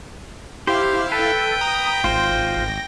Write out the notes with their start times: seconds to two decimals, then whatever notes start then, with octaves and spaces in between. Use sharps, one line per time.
0.67 E4 G4 C5 F5
1.12 A4 B4 G5
1.61 A#5 D#6
2.04 G#1 F4 C5 A#6